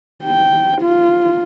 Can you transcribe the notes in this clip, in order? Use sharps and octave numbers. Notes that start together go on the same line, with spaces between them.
G5
F4